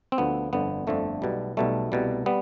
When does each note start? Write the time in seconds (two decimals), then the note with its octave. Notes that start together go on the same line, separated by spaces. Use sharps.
0.12 C4
0.18 D2 D3 F3 B3
0.53 G1 F2 D3 F3 B3
0.87 G1 F2 D3 F3 A3
1.22 B1 B2 G3
1.57 B1 B2 G3 A3
1.92 C2 B2 G3
2.26 G3 B3